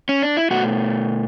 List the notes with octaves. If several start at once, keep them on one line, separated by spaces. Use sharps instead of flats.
C#4
D4
E4
B2 A3 F#4